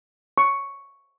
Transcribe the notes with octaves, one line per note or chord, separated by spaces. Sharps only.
C#6